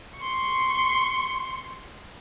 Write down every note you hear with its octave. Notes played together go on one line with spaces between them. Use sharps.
C6 C#6